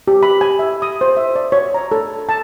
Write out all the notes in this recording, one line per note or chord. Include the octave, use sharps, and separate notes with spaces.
G4
B5
G#5
E5
D#6
C5
E5
D5
C#5
A#5
A4
A5